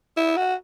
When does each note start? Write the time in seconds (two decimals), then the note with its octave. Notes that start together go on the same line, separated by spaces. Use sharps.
0.17 E4
0.37 F#4